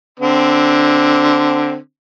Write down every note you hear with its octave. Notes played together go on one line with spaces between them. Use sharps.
D3 C4